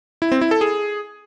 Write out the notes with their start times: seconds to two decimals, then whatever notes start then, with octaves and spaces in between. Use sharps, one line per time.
0.22 E4
0.32 C4
0.41 E4
0.51 A4
0.61 G#4